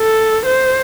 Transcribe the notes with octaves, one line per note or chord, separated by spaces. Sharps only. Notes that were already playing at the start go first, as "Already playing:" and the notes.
Already playing: A4
C5